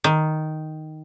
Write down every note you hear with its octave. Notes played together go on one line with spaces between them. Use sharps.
D#3